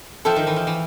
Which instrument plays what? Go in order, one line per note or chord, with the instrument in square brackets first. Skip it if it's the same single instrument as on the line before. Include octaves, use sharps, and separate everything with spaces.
[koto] F3 [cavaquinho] A4 C5 E5 G5
[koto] D#3
E3
F3
E3